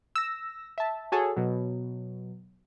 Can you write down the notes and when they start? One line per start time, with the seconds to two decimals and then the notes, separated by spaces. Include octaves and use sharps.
0.15 E6 A#6
0.78 E5 A5
1.12 F#4 G#4 A4 C#5
1.37 B2 F#3